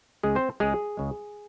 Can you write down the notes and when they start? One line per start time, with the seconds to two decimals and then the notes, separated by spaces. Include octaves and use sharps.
0.23 C#2 C#3 G#3 G#4
0.35 C4 C5
0.60 C#2 C#3 G#3 G#4
0.97 C#2 C#3 G#3